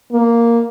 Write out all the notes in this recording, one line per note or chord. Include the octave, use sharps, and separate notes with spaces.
A#3